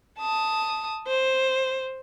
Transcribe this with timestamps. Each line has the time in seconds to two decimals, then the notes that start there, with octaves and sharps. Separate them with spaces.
0.19 A5 D#6
1.07 C5